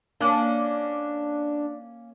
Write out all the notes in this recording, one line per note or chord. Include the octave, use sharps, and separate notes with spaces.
A#3 C#4 D4